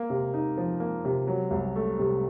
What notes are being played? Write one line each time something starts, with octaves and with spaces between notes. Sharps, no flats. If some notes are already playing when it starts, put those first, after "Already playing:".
Already playing: A#3
C3
D#4
F3
A#3
C3
F#3
C2
A3
C3